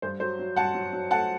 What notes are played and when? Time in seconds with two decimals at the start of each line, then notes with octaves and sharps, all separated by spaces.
0.02 G2 C5
0.20 F#3 C5
0.39 F#3
0.56 G2 F#5 A5
0.75 F#3
0.93 F#3
1.11 A3 F#5 A5